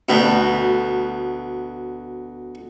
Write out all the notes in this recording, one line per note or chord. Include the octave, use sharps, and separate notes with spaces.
D2 B2